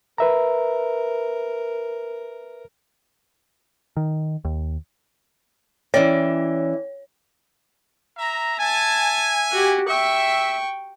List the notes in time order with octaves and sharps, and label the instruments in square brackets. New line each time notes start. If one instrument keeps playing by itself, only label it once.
[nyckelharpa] A#4 [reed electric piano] B4 E5 A#5
[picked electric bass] D#3
D#2
[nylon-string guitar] E3 C#4 D5 [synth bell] C#5
[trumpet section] E5 A#5
[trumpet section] E5 G#5 [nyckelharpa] A5
[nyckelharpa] F#4 G4
[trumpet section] E5 [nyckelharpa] G5 C#6